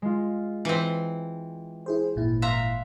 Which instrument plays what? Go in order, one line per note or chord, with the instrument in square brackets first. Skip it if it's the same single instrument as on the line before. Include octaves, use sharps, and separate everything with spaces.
[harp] G#3 F4
[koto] E3 C4
[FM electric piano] E4 G#4 C5
G#1 A#2 E4
[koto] E5 A#5 [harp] F5 C6 F#6